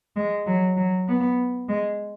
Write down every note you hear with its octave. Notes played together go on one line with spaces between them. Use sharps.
G#3
F#3
F#3
B3
G#3